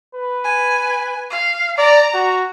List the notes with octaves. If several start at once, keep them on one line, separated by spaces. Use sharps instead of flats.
B4
G#5
F5
D5 A#5
F#4